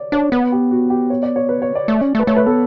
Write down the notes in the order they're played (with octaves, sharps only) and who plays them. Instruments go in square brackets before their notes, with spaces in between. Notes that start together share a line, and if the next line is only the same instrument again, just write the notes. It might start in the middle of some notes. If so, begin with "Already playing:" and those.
Already playing: [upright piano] C#5 D5
[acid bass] D4 [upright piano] C#5
[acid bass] B3 [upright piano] B4
[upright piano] G4
F#4
G4
C#5
D5
C#5
B4
C#5
D5
[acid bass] A3
C#4
A3
[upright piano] B4
[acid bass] A3 [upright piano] C#5
[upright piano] B4
[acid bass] B3 [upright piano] A4